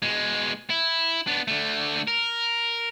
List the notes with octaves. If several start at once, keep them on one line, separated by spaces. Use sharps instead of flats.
B2 G#3
E4
B3 D4
D3 A3
A#4